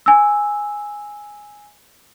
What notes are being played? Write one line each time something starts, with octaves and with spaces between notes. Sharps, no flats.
G#5 E6